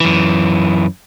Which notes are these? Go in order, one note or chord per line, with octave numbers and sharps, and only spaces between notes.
F#2 E3